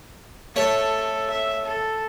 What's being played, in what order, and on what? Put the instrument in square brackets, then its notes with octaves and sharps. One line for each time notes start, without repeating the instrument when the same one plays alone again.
[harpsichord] A3 C#5 [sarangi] A4
[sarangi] E5
A4